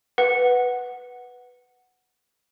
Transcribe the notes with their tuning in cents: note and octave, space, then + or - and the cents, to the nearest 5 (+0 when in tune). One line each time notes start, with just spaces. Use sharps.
B4 +0 F#5 +0